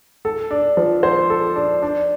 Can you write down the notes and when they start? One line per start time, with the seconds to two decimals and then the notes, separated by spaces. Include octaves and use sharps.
0.25 A4
0.51 D4
0.77 F3
1.03 C5
1.30 A4
1.56 D4
1.83 D4